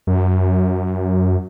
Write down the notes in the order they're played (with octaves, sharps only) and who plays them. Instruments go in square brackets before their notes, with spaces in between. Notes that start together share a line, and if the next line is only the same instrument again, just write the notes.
[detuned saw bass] F#2